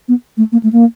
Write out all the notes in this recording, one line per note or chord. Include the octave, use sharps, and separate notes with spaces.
B3
A3
A#3
A3
A#3